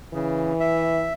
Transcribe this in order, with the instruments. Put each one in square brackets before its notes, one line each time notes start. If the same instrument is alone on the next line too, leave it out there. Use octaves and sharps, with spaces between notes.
[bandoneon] C#3 [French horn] E3
[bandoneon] E5